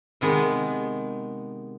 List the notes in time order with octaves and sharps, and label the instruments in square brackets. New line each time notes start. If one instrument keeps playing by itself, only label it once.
[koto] C3 D#3 G#3 B3